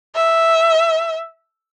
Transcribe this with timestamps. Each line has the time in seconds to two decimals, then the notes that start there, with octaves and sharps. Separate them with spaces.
0.15 E5